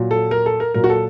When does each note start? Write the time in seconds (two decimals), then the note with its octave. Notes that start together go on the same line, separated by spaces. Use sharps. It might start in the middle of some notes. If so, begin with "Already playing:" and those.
Already playing: A#2 F#3
0.11 A4
0.31 A#4
0.46 A4
0.60 A#4
0.74 A#2 F#3 A#4
0.84 F#4
0.90 A4